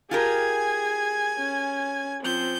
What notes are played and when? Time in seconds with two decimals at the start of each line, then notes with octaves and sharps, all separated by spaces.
0.11 F4 G4 G#4 A#4 G#5 G#6
1.38 C#4
2.22 F3 C4 G6